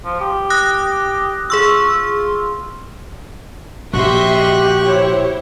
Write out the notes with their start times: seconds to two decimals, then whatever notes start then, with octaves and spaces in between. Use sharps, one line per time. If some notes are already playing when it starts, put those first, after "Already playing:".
0.05 F3
0.21 G4
0.50 D#6 F#6 A#6
1.50 F4 G#4 C#6 E6
3.93 A#1 F#4 G4 D#5 E5 C6 C#6 F#6
4.82 E4 C5 C#5